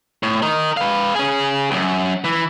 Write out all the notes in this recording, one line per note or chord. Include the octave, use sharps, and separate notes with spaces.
A2
A#4 D#5
B4 F5
C#4 G#4
C#2 F#2
E3